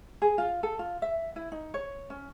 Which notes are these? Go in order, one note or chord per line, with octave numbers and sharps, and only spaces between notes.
G#4
F4
A4
F4
E5
E4
D#4
C#5
C#4